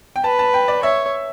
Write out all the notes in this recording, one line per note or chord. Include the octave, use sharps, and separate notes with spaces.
G5
B4 A5
A5
G5
D5
C#5 E5